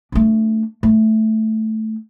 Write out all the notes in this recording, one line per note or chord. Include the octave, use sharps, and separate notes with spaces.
A3 D4
A3